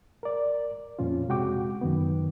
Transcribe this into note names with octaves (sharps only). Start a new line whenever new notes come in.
A#4 D5
F2 A#2 F3 C#4 F4
C3 G#3 F#4 G5 D6
F#2 D#3 B3